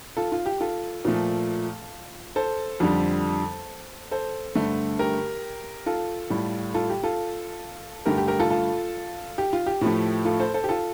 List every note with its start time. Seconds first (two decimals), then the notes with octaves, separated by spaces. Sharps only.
0.17 F4 A4
0.32 F4
0.46 G4
0.60 F4 A4
1.05 A#2 F3 A3
2.36 A4 C5
2.80 F2 D3 G3
4.11 A4 C5
4.55 G2 D3 A3
4.99 G4 A#4
5.86 F4 A4
6.30 A2 G3
6.74 F4 A4
6.90 G4
7.03 F4 A4
8.06 G2 D3 A3 G4 A#4
8.17 G4
8.28 G4 A#4
8.39 F4 A4
8.50 F4 A4
9.38 G4
9.53 F4
9.66 G4
9.81 A2 F3 A3
10.25 F4 A4
10.40 A4 C5
10.54 A4 C5
10.64 G4
10.69 F4 A4